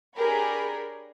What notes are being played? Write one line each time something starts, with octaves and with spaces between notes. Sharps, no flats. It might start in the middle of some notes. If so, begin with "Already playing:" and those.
D4 G4 G#4 A#4 C#5 B5